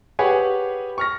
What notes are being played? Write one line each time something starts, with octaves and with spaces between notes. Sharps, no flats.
G4 G#4 B4 C#5 F#5 G#5
C#6 F6 A#6